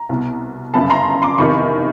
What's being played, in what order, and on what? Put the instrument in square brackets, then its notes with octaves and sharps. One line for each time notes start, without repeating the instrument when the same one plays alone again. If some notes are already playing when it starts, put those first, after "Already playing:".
Already playing: [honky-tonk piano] A#5
C2 B2
G1 F#2 C#3 A5 B5
A#5 C6
C6 D6
F1 E2 C3 D#3 B5 C#6